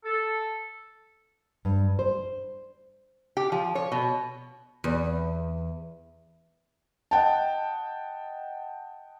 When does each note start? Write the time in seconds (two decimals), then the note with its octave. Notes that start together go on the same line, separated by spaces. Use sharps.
0.04 A4
1.65 G2
1.99 C5
3.37 G4
3.52 F3
3.75 C#5
3.92 B2
4.84 E2
7.11 D#5 F#5 G5 A5